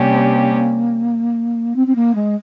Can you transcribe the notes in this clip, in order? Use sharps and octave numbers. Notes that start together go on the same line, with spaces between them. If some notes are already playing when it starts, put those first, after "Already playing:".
Already playing: C3 G3 A#3 C#4 G4
C4
C4
A#3
G#3